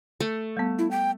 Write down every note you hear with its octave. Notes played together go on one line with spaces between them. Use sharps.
A3
G3 B3
E4
G5